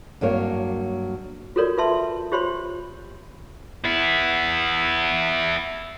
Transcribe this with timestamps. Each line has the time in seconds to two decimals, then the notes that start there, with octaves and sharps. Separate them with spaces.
0.21 G2 F#3 A#3 C#5
1.56 F4 F#4 A4 A#4 C#5 D5
1.78 F4 B4 E5 A5 C6
2.32 F4 G4 C5 C#5 B5 C6
3.85 B3 E4